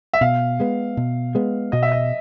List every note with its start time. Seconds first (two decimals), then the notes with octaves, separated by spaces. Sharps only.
0.13 E5
0.21 B2 F5
0.60 G#3 B3
0.97 B2
1.35 G#3 B3
1.72 B2 D#5
1.83 E5
1.92 D#5